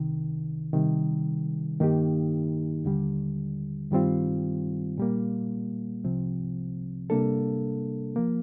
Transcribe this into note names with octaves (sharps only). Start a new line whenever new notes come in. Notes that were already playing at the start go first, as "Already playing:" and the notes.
Already playing: C2 C3 D#3
C3 D#3 G3
G2 D#3 A#3 D#4 G4
D#2 D3 G3
G2 D#3 G3 C4 F4
A#2 G3 A#3
C2 C3 F3 C4
C3 G3 A#3 D4 A4
F3 A#3